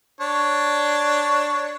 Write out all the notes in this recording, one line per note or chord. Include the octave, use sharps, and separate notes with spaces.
D4 C#5